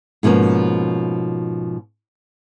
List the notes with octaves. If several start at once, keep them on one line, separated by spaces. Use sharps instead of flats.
G#2 B2 F3 A#3 C#4